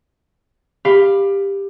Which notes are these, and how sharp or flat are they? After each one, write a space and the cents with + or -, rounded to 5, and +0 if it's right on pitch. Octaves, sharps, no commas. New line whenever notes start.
G4 +15 F5 +0 B5 +5